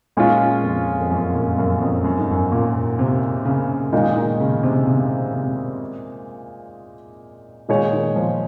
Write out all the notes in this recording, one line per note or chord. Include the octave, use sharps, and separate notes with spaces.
A#2 G#3 C#4 F4
F2
F2
F#2
A#2
F#2
F2
F#2
G#2
F#2
A#2
C3
C#3
A#2 D#3 G#3 D#4
D#3
C#3
C3
C3
C3
A#2 D#3 G#3 D#4 G#4 C#5
D#3
F3